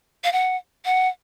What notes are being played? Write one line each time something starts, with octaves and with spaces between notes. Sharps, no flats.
F5
F#5
F#5